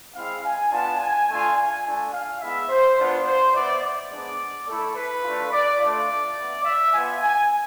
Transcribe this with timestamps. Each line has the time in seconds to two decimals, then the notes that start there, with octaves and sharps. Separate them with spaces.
0.15 G#3 C4 E4 F5
0.44 G#5
0.71 B3 D4 F4 A5
1.00 G#5
1.28 A3 D4 F4 G#5
1.57 G#5
1.84 A3 D4 F4 G#5
2.13 F5
2.41 G#3 B3 E4 E5
2.69 C5
2.97 B3 D4 F4
3.26 C5
3.54 B3 E4 D5
3.82 D5
4.10 G#3 B3 D4
4.67 A3 E4 A4
4.95 B4
5.23 A3 D4 F4
5.52 D5
5.80 A3 D4 F4 D5
6.37 B3 E4
6.64 E5
6.92 B3 F4 G#5
7.21 G#5